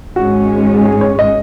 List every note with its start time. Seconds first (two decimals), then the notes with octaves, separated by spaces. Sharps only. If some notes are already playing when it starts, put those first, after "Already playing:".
0.15 G#1 G#2 G#3 C#4 F#4
0.85 G#4
1.01 C#5
1.19 D#5